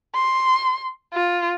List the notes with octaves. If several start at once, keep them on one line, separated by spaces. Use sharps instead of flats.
C6
F4